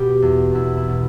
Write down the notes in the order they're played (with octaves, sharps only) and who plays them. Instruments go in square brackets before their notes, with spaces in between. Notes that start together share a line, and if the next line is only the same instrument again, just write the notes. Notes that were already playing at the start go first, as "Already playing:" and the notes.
Already playing: [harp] B2 G4
E2
E2 E4
E4
B2